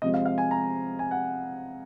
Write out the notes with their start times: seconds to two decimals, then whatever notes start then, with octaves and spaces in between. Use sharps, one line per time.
0.02 C3 F3 G#3 C4 D#5
0.14 F5
0.26 F5
0.38 G#5
0.51 A#5
0.99 G#5
1.11 F#5